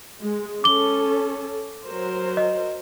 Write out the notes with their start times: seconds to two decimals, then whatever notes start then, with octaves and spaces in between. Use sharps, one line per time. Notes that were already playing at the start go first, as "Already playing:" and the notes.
0.22 G#3
0.64 C#4 A4 D6 G7
1.85 F#3 A#4 C5
2.37 D#5